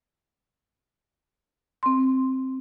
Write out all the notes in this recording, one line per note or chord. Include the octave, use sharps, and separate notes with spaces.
C4 C6